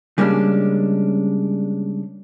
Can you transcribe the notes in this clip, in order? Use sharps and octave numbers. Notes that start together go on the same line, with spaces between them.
C#3 G3 G#3 A#3 C#4 D4